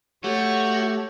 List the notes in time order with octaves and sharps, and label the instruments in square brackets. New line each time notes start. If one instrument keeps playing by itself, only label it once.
[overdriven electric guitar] A3 [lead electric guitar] F#4 [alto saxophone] G4 [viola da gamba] C#5